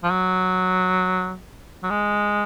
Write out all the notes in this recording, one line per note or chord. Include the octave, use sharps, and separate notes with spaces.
F3
F#3
F#3
G#3